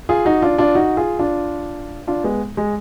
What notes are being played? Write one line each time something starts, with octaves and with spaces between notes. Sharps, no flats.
F4 G#4
D#4 F#4
D4 F4
D4 F4
D#4 F#4
F4 G#4
D4 F4
D4 F4
G#3 B3
G#3